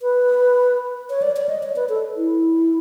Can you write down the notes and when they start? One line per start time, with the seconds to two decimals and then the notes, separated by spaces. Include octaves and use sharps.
0.02 B4
1.10 C#5
1.22 D5
1.37 D5
1.49 D#5
1.63 C#5
1.76 B4
1.89 A4
2.16 E4